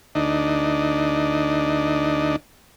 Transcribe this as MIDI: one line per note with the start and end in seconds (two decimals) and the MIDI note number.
0.15 2.36 38
0.15 2.36 62
0.15 2.36 63